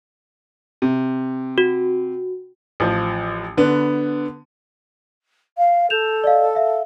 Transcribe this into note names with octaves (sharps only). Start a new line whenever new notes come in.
C3
F#4
A1 F3
D3 B3
F5
A4 G6 E7 F7
D5 D#5 F5
E5 F5